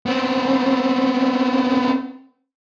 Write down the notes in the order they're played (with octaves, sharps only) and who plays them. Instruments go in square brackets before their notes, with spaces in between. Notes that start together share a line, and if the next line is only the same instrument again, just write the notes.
[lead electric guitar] B3 C4